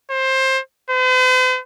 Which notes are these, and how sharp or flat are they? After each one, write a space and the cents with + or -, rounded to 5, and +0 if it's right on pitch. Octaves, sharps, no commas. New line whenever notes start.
C5 +20
C5 -45